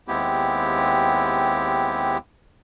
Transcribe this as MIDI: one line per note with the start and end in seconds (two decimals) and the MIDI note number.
0.08 2.17 39
0.08 2.17 56
0.08 2.17 59
0.08 2.17 60
0.08 2.17 64
0.08 2.17 67